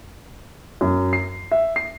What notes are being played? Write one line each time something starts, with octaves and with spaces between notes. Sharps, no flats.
F#2
C7
E5
C7